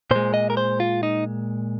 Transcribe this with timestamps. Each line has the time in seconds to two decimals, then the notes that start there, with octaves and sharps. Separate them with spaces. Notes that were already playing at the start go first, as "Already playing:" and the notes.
0.11 A#2 G#3 C5
0.34 D#5
0.50 A#4
0.57 C5
0.80 F4
1.03 D#4